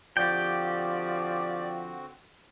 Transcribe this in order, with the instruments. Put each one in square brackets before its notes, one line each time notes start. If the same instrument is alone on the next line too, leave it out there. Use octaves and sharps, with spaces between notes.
[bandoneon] D3 C4 F#4 [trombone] F3 [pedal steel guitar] G4 G5 [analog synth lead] D5